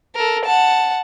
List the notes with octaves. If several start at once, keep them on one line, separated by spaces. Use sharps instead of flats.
A4 A#4
F#5 A5